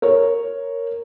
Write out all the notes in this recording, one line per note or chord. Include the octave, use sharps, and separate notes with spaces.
A#4 C#5